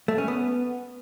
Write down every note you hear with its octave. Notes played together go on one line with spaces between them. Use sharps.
A3
C#4
B3